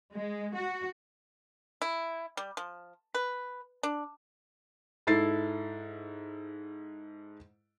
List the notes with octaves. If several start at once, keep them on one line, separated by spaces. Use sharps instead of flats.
G#3
F#4
E4
G3
F3
B4
D4
G#2 E4 A4 A6 C7